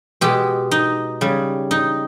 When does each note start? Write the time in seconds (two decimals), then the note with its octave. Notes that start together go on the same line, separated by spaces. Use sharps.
0.21 B2 G#3 G4
0.71 D#4
1.21 C#3 G3
1.71 D#4